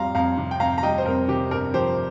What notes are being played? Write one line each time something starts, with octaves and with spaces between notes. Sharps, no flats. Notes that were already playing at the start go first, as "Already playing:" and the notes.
Already playing: F2 G3 F5 A#5 C6
F2 F5 A#5
C3
G5
F2 F5 A#5
A#5
G3 D#5 G5
C5
F2 A#4
C3 G4
G1 A#4
F3 G4 C5